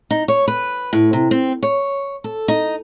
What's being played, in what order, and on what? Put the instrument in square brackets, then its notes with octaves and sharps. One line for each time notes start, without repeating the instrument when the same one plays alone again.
[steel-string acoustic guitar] D#4
C#5
B4
A2
C3
C4
C#5
A4
D#4